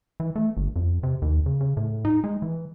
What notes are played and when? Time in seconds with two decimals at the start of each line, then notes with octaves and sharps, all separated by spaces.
0.20 E3
0.36 A3
0.57 G1
0.76 F2
1.03 C3
1.22 D#2
1.46 C#3
1.61 C#3
1.77 A2
2.05 D#4
2.24 G#3
2.42 E3